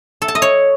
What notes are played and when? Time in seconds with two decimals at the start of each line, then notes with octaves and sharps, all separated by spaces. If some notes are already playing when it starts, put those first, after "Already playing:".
0.22 A4
0.28 A5
0.35 D#5
0.42 C#5